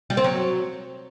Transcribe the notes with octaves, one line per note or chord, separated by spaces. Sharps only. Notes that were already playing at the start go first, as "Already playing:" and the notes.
G3
C4
F#3